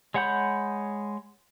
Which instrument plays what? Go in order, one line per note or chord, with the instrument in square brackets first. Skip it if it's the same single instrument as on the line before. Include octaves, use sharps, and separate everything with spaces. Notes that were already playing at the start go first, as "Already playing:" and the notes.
[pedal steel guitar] G#3 C#5 F#5 B5 G6